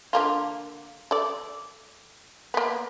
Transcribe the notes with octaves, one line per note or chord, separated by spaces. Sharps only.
D3 A#3 F4
A4 D5
A#3 B3